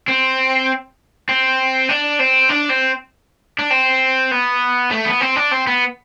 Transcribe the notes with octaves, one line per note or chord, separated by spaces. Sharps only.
C4
C4
D4
C4
D4
C4
D4
C4
B3
A3
B3
C4
D4
C4
B3